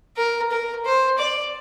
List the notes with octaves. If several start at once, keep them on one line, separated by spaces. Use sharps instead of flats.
A#4
A#4
C5
D5